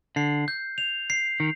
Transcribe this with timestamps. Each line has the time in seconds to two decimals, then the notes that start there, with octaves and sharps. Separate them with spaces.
0.16 D3 C7
0.48 G6
0.78 F7
1.10 C7
1.40 D#3